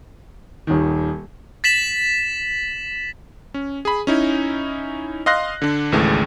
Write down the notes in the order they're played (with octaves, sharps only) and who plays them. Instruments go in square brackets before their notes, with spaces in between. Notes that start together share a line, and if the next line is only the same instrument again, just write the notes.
[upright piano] D#1 D#3
[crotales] A6 B6 E7 F#7
[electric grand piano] C#4
G#4 B5
C#4 D#4 E4
D#5 F5 C6 F#6 A#6
D3 D4
G#1 C#2 E3 A3 G#4